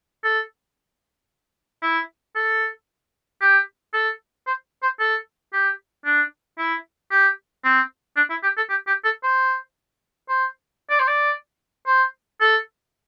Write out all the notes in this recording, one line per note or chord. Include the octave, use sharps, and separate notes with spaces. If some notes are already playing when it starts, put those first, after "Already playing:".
A4
E4
A4
G4
A4
C5
C5
A4
G4
D4
E4
G4
C4
D4
E4
G4
A4
G4
G4
A4
C5
C5
D5
C5
D5
C5
A4